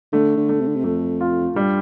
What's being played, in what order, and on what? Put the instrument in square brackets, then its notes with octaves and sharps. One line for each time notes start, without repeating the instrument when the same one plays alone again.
[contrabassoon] D3 [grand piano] A3
[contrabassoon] D3
[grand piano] A3
[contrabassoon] C3
D3
C3
[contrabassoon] F2 [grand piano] A3
[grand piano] F4
[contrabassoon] G2 [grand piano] G3